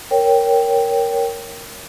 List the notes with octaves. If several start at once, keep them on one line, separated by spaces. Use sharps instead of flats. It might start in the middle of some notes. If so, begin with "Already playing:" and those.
A#4 C#5 G5